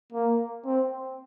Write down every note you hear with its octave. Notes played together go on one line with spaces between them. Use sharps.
A#3
C4